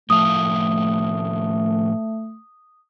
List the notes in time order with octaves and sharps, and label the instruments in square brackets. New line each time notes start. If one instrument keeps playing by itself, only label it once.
[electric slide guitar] A2 F3 F5 [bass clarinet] A3 [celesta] D#6